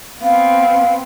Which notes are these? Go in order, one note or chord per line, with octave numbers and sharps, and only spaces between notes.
B3 C4 F5